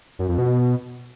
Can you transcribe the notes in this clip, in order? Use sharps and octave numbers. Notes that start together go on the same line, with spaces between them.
F#2
F2
B2